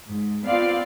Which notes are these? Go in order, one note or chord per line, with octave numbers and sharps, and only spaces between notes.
G#2
B3 C4 F4 D5 F5